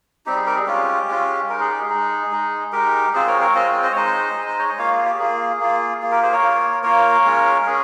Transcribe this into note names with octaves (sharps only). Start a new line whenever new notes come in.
G3 C4 D#4 G4
G#4
G4 A#4
G#4
G#3 C#4 F4 G4
G#3 C#4 F4
G#3 D#4 A#4
G#4
G4
G#4
G#3 D#4
G#3 D#4
G#3 D#4 G4 A#4
G#3 C4 F4 G#4 C5
A#4 C#5
A#4 C#5
G#3 C4 F4 C5 D#5
C5 D#5
C#5
G#3 D#4 C5 D#5
G#3 D#4
C5
C#5
D#5
A#3 F4 C#5 F5
G#4
G4
A#3 F4 G#4
A#3 F4
A#3 F4 G#4
G4 A#4
G#4 C5
A#4 C#5
A#3 F4
A#3 F4 A#4 C#5
G#3 C#4 F4
A#4
G#3 C#4 G#4